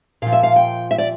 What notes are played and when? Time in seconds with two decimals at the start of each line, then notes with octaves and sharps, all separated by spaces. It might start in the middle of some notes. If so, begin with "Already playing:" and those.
0.22 A#2 F3 F5
0.33 E5
0.43 F5
0.56 G5
0.91 E5
0.98 D5